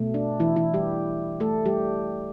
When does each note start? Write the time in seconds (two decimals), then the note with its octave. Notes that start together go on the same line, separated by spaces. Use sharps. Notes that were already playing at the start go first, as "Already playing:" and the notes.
Already playing: B2 A3
0.14 D4
0.40 E3 E4
0.56 E3 E4
0.74 G3 G4
1.40 A3 A4
1.66 G3 G4